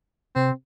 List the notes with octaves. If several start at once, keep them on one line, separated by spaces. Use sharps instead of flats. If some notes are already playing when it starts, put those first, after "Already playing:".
C3 C4